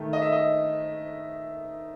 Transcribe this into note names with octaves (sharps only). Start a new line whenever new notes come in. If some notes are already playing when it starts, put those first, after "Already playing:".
Already playing: D#3 A3
D#5
E5
D#5